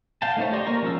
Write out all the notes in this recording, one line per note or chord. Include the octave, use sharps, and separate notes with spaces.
F5 G5 A5
A3 D#4 C5 C#5
G4 D5 D#5 C6 C#6
A#3 A#4 A#5 C#6
F3 G#3 C#4 F5 E6